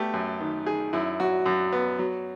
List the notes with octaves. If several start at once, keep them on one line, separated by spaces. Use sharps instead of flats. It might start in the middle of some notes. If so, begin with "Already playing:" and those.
Already playing: A3 B3 G4
F#2
D#3
D#3 G#4
F#2 E4
F#3 F#4
F#2
B3
F#3